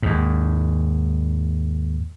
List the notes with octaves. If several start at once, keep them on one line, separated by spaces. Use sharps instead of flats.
D#2 G#2